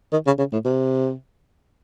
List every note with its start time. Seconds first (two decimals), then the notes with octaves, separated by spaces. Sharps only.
0.12 D#3
0.26 C#3
0.38 C#3
0.52 A2
0.65 C3